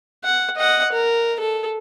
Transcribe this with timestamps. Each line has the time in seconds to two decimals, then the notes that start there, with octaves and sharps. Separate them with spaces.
0.24 F#5
0.56 D#5 F#5
0.92 A#4
1.40 A4